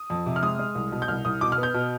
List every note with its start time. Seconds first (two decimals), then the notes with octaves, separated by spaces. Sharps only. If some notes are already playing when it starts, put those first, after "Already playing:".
Already playing: D#6
0.10 F2
0.26 C3
0.36 F6
0.43 G#3 D#6
0.59 G#3
0.75 C2
0.92 B2
1.02 G6
1.08 C2 F6
1.25 C2 D#6
1.41 B2 D6
1.52 F6
1.58 B3
1.63 G6
1.74 B2